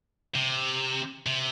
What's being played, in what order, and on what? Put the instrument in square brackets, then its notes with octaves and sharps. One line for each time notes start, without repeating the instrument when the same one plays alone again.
[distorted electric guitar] C3
C3